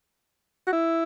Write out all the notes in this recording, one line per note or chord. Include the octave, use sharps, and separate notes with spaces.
F#4
E4